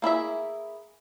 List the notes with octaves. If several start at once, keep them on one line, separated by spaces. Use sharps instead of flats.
A#3 E4 G#4 E5